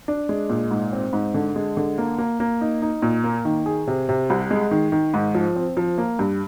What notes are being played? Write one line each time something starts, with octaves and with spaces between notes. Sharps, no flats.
D4
G#3
A#2
G#2
C4
G#2
D3
G#3
D3
A#3
A#3
A#3
D#4
D#4
A#2
A#3
D#3
G#4
C3
C3
C2
G#3
D#3
D#3
G#2
F3
C4
F3
A#3
G2